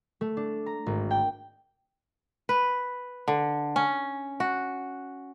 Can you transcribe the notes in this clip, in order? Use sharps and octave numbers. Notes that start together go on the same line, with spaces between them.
A3
D4
A#5
G#1
G5
B4
D3
C#4
F#4